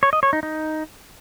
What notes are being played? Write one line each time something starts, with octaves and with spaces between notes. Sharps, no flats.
C#5
D#5
C#5
D#4
D#4